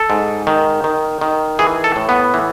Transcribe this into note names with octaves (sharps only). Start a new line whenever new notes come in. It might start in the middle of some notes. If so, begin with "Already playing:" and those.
Already playing: A4
G#2
D#3
D#3
D#3
E3 G#4
A4
A2
B3
E3